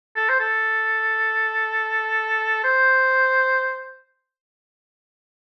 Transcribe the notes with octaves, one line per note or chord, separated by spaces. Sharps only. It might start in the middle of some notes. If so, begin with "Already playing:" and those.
A4
C5
A4
C5